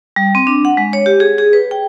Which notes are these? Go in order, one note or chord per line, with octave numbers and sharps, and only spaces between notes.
G3
C4
D4
F#5
G#3
C#5
G4
G#4
G#4
B4
G5